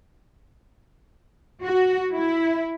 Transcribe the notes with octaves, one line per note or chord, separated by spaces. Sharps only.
F#4
E4